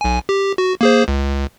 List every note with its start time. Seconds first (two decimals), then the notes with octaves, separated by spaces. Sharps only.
0.01 B1 G#5
0.29 G4
0.58 F#4
0.81 A#3 G#4 C5
1.08 C#2